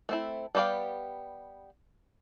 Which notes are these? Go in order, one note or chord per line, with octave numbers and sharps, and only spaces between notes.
A3 C4 E4
G3 B3 G4 D5 F5